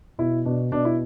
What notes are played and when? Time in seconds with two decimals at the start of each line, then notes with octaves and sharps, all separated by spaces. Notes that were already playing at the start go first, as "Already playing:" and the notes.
0.19 B2 E4
0.45 B2 D4
0.72 B2 D4
0.85 E4